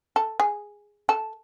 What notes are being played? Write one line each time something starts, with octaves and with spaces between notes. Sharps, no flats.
A4
G#4
A4